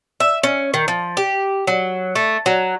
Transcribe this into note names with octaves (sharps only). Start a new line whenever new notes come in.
E5
C#4
D#3
F3
G4
F#3
A3
F#3